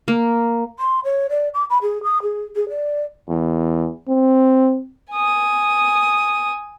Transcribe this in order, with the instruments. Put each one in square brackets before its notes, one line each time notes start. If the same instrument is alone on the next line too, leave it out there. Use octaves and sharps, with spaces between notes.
[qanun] A#3
[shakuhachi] C6
C#5
D5
D6
B5
G#4
D#6
G#4
G#4
D5
[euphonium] E2
C4
[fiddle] G#5 D#6